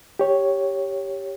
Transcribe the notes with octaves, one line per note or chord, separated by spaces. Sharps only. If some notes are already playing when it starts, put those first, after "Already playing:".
G4 C#5